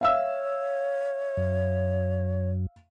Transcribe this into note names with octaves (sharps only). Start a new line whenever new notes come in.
C#5 E5 F5 E6
F#2